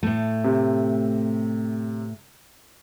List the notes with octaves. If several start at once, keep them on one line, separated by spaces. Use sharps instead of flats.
A2 A3
C3